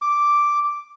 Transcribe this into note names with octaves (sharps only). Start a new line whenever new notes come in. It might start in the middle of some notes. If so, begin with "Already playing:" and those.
D6